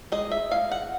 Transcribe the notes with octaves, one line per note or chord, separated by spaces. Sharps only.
G#3 D#5
E5
G#3 F5
F#5